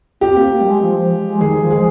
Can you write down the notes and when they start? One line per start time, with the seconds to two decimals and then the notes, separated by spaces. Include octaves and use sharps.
0.21 C4 G4
0.36 A#3
0.51 A#3
0.61 G3
0.67 G#3
0.81 F3
1.11 G#3
1.26 G#3
1.41 D#3 G#4
1.61 F3
1.71 G#3 G#4